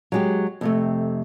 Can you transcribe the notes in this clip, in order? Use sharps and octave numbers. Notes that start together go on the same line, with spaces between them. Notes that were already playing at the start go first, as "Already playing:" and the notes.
F#3 G#3 G4
F2 C3 A3